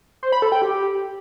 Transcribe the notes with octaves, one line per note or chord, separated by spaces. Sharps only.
C5
B5
A4
G5
G4